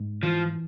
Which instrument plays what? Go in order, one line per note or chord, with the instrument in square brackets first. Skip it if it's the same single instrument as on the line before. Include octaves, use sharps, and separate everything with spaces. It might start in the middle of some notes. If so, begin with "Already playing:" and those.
Already playing: [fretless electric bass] G#2
[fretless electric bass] E3 [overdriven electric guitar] F3